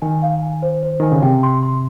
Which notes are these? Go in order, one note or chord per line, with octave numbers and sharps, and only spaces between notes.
D#3 G#5
F5
G#5
C5
C5
D#3 G#5
C#3
C3 G5
C6
C6